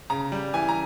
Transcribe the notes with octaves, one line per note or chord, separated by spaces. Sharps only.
C#3 A#5
G3
E3 G#5
A#5